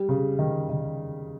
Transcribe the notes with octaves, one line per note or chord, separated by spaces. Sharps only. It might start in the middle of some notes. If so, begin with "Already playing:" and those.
Already playing: G3
C#3
D#3
D#3